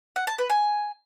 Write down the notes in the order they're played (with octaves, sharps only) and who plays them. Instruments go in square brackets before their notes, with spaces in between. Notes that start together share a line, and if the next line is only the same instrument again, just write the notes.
[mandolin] F#5
A5
B4
G#5